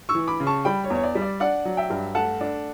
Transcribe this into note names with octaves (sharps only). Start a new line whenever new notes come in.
C#6 E6
E3
B5 D6
C#3
A5 C#6
G3 G5 B5
C#5
E2
C#5
D5
G3
D5
D4 D5 F#5
F#3
E5 G5
G2
A3 F#5 A5
D4